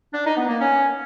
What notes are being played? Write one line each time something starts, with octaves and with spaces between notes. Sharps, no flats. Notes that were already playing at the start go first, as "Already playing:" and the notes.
D4
D#4
B3
A#3
C#4